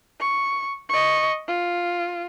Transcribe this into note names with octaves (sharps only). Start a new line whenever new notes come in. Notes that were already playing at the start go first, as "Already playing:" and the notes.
C#6
D#5 C#6
F4